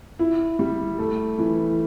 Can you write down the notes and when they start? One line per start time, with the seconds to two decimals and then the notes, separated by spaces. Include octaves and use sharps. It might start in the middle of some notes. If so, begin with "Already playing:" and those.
0.19 E4
0.59 G3
0.99 A3
1.38 E3